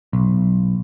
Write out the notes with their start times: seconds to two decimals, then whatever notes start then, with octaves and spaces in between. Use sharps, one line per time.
0.13 B1